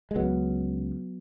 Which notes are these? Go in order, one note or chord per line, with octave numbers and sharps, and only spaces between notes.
G#3
C#2 C#3 F#3 B3